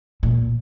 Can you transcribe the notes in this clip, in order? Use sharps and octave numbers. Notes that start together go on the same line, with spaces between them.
A#2